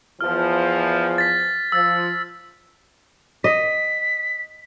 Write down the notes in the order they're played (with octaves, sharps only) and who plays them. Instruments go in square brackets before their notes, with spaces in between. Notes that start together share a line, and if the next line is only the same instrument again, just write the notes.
[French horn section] E2 F3 [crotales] F6
[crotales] A6 B6
[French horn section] F3 [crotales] E6 A6
[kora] D#5 [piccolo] B6